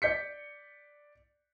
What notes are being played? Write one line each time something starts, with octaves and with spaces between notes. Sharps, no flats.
D5 G6 B6 C#7